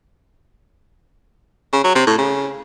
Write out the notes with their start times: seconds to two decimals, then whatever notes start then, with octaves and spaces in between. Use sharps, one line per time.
1.72 C#3
1.84 F#3
1.95 C3
2.07 A2
2.18 C#3